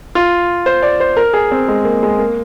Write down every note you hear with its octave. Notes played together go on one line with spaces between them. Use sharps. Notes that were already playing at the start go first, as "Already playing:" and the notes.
F4
C5
D5
C5
A#4
G#4
C4
G#3
A#3
G#3
A#3